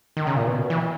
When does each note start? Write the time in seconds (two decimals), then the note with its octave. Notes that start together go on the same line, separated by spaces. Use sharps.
0.17 D#3
0.27 C#3
0.36 A#2
0.47 B2
0.70 E3